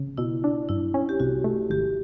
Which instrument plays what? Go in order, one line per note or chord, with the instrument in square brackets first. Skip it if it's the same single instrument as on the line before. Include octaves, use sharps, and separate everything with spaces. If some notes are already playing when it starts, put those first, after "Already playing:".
Already playing: [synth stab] C#3
[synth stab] B2 [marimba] E4
[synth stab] D4
[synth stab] G2 [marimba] E4
[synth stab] C#4
[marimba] G4
[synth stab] C2 [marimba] F#4
[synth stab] A3
[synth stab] G#1 [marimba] G4